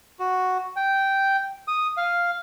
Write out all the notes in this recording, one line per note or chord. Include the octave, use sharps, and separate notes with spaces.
F#4
G5
D#6
F5